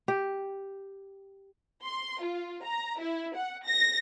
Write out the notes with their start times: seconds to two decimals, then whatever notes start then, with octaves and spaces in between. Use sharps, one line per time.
0.08 G4
1.83 C6
2.21 F4
2.63 A#5
2.99 E4
3.36 F#5
3.65 A#6